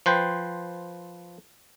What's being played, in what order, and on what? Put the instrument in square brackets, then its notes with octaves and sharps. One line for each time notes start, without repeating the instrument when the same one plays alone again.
[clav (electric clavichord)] F3 B4 C5 G5